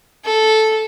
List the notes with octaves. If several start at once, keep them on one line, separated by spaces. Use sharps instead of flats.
A4